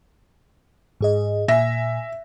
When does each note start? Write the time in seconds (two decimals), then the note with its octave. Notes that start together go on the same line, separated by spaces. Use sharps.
1.01 G#2 G#4 D#5
1.48 A#2 E5 G#5 A#6